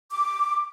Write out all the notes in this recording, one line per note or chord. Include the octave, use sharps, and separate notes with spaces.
D6